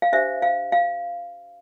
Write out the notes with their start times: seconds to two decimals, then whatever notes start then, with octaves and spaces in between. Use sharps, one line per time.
0.02 F5
0.13 D4 G4 C5 E5
0.42 F5
0.72 F5